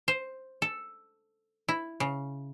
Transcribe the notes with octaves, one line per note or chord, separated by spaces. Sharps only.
C5
A4
E4
C#3